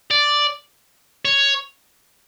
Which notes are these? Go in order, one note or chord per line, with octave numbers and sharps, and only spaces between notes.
D5
C#5